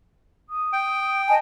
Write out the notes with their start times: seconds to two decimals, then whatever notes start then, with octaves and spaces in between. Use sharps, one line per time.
0.49 D#6
0.73 G5
1.27 D#5 G#5 A5